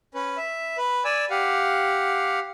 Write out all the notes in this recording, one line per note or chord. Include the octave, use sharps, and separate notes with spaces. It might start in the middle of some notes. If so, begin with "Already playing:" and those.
C#4 B4
E5
B4
D5 G#5 E6
G4 F5 F#5